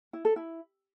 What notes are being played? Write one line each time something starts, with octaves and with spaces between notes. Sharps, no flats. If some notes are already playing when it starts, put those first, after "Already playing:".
E4
A4
E4